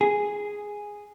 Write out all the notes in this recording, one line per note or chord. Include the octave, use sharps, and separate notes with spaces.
G#4